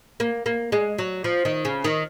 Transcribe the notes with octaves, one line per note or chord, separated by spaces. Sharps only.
A#3
A#3
G#3
F#3
F3
D#3
C#3
D#3